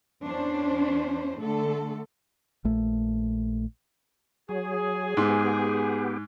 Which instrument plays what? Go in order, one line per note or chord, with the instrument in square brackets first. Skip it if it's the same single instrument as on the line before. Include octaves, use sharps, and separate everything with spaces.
[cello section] E2 C#4 D4 C5
D3 A3 A4
[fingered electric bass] A#1 A3
[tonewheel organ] F#3 [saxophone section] G#4
[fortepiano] G#2 [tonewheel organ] B3 G4